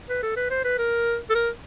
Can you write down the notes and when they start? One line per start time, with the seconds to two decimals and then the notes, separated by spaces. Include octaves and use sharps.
0.09 B4
0.23 A4
0.36 B4
0.50 C5
0.64 B4
0.78 A#4
1.30 A4
1.35 A#4